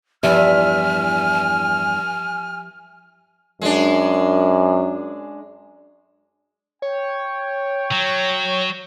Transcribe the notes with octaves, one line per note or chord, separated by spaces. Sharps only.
E2 G2 F3 G4 E5 G#5 F6
F#2 G#3 D4
C#5 G5
F#3